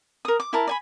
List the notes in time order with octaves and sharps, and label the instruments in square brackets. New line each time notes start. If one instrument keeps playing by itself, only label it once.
[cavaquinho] A#4 D#6
D6
E4 A#4 A5
D5 G#5 B5